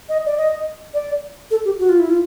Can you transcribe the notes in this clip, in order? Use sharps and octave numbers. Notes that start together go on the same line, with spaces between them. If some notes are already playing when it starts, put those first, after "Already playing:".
D#5
D5
D#5
D5
A4
G4
F#4
F4
E4
F4